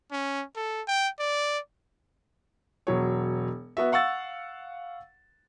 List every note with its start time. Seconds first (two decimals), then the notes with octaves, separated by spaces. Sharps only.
0.12 C#4
0.56 A4
0.88 G5
1.19 D5
2.87 E1 F#3 C#5
3.77 B3 F#4 E5
3.92 F5 F#5 C#6 E6 A6